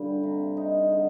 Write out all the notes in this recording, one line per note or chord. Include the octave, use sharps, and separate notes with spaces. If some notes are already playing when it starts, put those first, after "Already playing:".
Already playing: G2 D3 G3
C3
D#4
D3